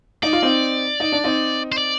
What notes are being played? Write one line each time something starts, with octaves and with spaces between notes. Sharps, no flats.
D#4 D5
F4
C4 D#4
D#4
D4
C4 D#4
C5
D5